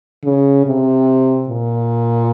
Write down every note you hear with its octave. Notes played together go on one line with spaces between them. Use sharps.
C#3
C3
A#2